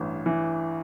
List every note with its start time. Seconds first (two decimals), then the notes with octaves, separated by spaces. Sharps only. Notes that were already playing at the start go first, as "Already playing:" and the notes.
Already playing: A1 G2 E3
0.26 E3